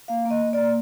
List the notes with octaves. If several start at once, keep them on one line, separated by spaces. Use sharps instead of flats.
A#3 F5
A#3
D#5
A#3
D5
A#3